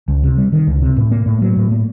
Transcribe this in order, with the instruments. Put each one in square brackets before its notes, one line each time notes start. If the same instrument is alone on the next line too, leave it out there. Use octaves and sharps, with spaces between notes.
[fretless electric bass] C#2
C3
G3
D#3
C#2
C3
A2
A#3
A2
F#3
A2
A#3